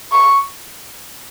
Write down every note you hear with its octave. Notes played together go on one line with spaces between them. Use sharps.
C#6